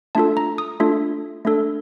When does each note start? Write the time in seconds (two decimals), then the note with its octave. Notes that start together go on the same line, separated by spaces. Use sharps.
0.15 A3 D4 F4 A4 A5
0.37 A#5
0.58 D#6
0.80 A3 D4 F4 A4
1.45 A3 D4 A4